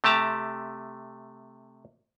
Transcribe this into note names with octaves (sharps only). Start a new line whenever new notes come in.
C3 A3 G4 A5 A#5